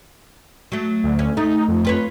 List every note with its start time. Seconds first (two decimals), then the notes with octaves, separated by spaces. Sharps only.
0.72 F#3 A3
1.04 D2
1.19 C#4
1.37 A3 D#4
1.68 F2
1.85 F4 B4 C#5